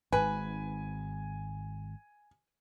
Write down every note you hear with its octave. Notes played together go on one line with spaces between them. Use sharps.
G#1 G#2 B4 G#5